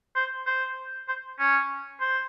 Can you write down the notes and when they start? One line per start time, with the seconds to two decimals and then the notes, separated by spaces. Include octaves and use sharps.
0.15 C5
0.46 C5
1.08 C5
1.39 C#4
2.00 C5